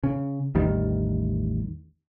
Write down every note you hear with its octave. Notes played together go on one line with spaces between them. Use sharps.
C#3
A1 E2 D#3 G3